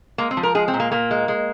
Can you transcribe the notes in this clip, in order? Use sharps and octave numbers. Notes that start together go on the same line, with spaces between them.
G#3 A#3
C4
F3
A#4
G#3 G#4
C4
A#2
A#3
A#2 A#3
G#3
G#3